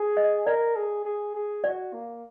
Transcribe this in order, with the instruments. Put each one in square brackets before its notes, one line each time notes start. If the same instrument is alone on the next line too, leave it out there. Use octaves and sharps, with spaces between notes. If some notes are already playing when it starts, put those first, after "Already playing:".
Already playing: [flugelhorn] G#4
[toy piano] D#5
[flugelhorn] A#4 [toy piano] D5
[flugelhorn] G#4
G#4
G#4
[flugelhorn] F#4 [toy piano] D5
[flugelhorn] A#3